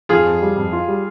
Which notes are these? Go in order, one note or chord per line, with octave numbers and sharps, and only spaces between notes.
F2 F4 G#4
F2
G3
F2
F4
G3